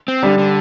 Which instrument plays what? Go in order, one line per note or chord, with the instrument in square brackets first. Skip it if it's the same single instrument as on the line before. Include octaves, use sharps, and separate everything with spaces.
[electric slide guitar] C4
[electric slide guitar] D3 [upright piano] G3
[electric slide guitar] D3